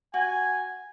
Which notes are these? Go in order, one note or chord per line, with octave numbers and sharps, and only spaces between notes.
F#4 G#5